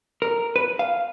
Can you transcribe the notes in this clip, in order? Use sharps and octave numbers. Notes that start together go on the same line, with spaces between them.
A#4
B4
F5